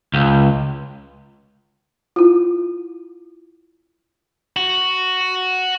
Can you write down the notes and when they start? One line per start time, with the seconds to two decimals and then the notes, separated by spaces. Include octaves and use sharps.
0.14 C#2
2.16 E4 F4
4.57 F#4